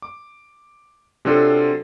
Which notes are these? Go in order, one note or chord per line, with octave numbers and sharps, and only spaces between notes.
D6
C3 F#3 D4 F4 A4